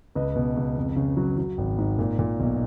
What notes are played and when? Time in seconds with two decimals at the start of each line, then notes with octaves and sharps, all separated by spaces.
0.16 C#2 B4 D#5
0.36 B2
0.57 C#2
0.77 F2
0.96 C#3
1.17 F#3
1.38 F#3
1.58 G#1
1.78 G#2
1.99 A#2
2.19 A#2
2.40 B1